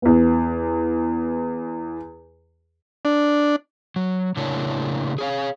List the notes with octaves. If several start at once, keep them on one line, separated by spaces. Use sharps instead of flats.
E2 B3
D4
F#3
A2 C#3 A#3 D4 E4 C#5
G#4 C#5 F5